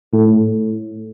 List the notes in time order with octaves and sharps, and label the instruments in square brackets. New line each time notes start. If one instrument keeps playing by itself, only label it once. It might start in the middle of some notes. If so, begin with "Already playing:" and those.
[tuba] A2